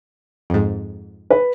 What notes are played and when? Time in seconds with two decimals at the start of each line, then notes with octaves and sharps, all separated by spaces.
0.50 F2 G#2
1.30 B4